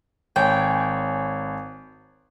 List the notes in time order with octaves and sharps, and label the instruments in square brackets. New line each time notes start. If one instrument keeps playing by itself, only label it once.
[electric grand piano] G#1 C#5 G#5 [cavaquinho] G5